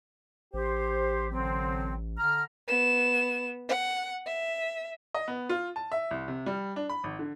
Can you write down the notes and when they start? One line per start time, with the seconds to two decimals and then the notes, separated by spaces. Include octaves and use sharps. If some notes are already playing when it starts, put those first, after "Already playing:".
0.54 A1 G4 C5
1.31 D3 F#3 C4
2.18 D3 A#5 F6
2.68 B3 E7
3.69 F#5
4.27 E5
5.14 D#5
5.28 B3
5.49 F4
5.76 A5
5.92 E5
6.11 C2
6.28 C3
6.46 G3
6.76 D4
6.89 B5
7.04 G#1
7.19 D3